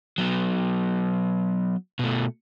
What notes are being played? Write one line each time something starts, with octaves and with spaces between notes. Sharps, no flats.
F#3 B3
B2 A3